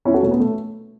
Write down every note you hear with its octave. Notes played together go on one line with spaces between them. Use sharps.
E2 C#4 E4
F#4 A4
B2 A3 C#4
B3
A3